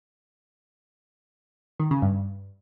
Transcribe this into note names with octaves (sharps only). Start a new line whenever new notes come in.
D#3
C#3
G2